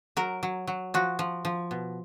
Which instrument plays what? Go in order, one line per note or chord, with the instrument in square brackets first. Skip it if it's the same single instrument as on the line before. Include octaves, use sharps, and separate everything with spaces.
[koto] F#3 A#4
F#3
F#3
F3 F#4
F3
F3
B2